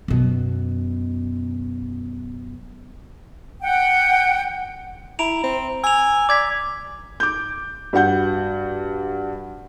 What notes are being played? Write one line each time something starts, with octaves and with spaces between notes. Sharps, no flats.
F#2 B2
F#5 G5
E4 A#5 D7 F7
C4
G#5 E6 F7
D5 D6 G#6 B6
D6 G6
G2 F#4 F#5 G6